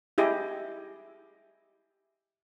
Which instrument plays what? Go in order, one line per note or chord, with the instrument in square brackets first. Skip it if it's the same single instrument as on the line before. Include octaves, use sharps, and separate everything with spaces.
[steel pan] E4 G4 G#4 D#5